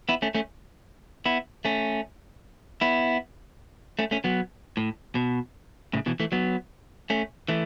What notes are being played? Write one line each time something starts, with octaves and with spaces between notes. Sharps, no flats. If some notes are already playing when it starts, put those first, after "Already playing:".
B3 E4
A3 C#4
A3 C#4
B3 E4
A3 C#4
B3 E4
A3 C#4
A3 C#4
F#3 B3
A2
B2
A2 C#3
B2 E3
E3 A3
F#3 B3
A3 C#4
E3 A3